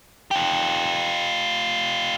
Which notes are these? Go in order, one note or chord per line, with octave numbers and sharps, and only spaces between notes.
F4 G4